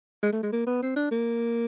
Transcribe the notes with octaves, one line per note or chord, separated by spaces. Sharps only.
G#3
A3
G#3
A#3
B3
C4
D4
A#3